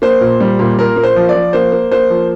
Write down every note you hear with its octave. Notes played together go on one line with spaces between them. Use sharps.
A#3 C5
A#2
G3
A#2
A#2 A#4
A#3
C5
F3
D5
F3
A#3 C5
A#3
A#3 C5
F3